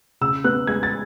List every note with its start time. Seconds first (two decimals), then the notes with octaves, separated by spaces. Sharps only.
0.21 C#3 E6
0.44 B3 F#6
0.67 G#3 G#6
0.83 A6